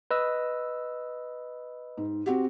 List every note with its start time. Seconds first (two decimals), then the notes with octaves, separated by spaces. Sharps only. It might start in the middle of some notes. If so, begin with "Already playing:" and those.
0.11 B4 D#5 E6
1.97 G#2
2.26 C4 F#4 G4